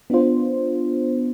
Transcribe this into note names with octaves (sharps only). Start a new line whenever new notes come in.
B3 D4 F4 C5